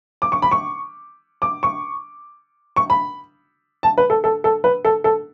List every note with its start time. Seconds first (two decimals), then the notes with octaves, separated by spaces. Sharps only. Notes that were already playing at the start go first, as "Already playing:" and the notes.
0.22 D6
0.32 C#6
0.42 B5
0.51 C#6
1.42 D6
1.63 C#6
2.76 C#6
2.90 B5
3.83 A5
3.98 B4
4.10 A4
4.24 A4
4.44 A4
4.64 B4
4.85 A4
5.04 A4